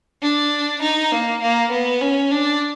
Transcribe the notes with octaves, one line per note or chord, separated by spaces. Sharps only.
D4
D#4
A#3
A#3
B3
C#4
D4